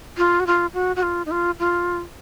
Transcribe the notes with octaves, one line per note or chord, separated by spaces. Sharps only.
F4
F#4
F4
F#4
F#4
F4
D#4
F4
F4